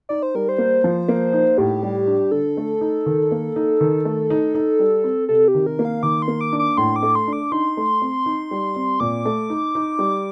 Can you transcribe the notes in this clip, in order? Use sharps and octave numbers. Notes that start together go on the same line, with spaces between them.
D#4 D5
C5
G3 A#4
C5
A#3
F3
A#3
D#4
A2 G4
G3
D4
D3 A4
A3
D#4
D#3
A#3
D#4
D#3
A3
D#4
D#4
G3
C4
C3 A4
G4
D#3
A#4
A#3
F5
D#3 D6
C6
A#3
D6
D4
D6
A2 C6
D6
A3
C6
D4
D6
D#4 C6
A3
C4
D#4
G3
C4
A#2 D6
A3
D#4
D#4
G3